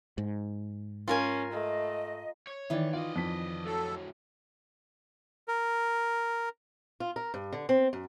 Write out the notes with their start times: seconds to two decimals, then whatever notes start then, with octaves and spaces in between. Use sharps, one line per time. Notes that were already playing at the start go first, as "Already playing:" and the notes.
0.18 G#2
1.08 C#4 F4 A#4 G#5
1.53 A3 D#5
2.47 C#5
2.70 D#3 E3 E4 D5
2.93 F4 D5 D#5
3.16 F2 B6
3.65 A2 F#3 A4
5.48 A#4
7.00 F4
7.16 A#4
7.34 G2
7.52 D3
7.69 C4
7.93 F#2